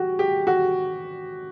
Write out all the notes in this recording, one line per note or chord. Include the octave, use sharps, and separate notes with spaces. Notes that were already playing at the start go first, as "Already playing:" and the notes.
Already playing: F#4 G4
G4
F#4